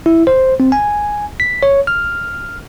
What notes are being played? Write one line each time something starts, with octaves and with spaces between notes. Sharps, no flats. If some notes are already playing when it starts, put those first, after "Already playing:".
E4
C5
C4
G#5
B6
C#5
F6